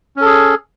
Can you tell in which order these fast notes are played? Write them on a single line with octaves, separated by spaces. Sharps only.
C#4 A4 G#4